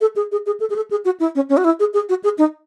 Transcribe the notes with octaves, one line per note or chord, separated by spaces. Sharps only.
A4
G#4
G#4
G#4
A4
G#4
A4
G#4
F#4
E4
C#4
C#4
F#4
E4
G#4
G#4
F#4
G#4
D#4